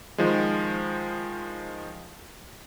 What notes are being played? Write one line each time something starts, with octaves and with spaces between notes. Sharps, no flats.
D#3 F3 G#3